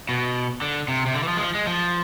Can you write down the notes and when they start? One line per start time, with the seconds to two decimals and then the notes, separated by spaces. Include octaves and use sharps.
0.09 B2
0.62 D3
0.88 C3
1.06 C3
1.14 D3
1.23 E3
1.28 F3
1.37 G#3
1.40 F3
1.55 G#3
1.67 F3